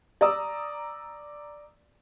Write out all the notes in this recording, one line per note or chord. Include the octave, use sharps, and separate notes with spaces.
D5 A#5 D#6 E6